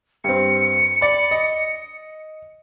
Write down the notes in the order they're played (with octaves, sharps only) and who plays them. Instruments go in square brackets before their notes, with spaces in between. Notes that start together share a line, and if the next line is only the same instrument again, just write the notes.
[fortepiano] G2 C4 [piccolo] C#7
[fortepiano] D5 B5
D#5